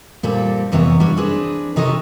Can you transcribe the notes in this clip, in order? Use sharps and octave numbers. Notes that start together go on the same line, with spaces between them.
A#2 G3 C4 A4
F2 C3 E3 B3 C#5
G3 D4 C#5
C4 D4 G#4 B4
C3 D#4 A4 C#5 D#5